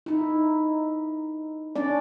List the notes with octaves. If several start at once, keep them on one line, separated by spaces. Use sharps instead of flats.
D#4 E4
C#4 D4 D5